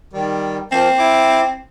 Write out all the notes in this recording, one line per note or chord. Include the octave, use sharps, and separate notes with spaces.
D#3 G3
F3 A#3 C4
E4 D6